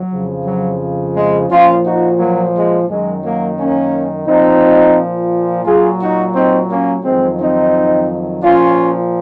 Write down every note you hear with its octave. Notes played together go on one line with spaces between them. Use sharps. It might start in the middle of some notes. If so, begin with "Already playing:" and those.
Already playing: F#3
F2 C#3 F3
F#3
G#3
A#2 F3 C#4 F4
D#4 F#4
F#3 A#3
G#3
F#2 D#3 F#3 G#3
F#3 A#3
A#3 C#4
A#2 F3 C4 D#4
A#2 F#3 F4 G#4
D#4 F#4
C4 D#4
A#3 C#4
F2 D#3 F#3 G#3 C4
C4 D#4
A#2 F3 C#4 F4